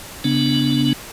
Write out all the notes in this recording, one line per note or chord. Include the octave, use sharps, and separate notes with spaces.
C#3 B3 D4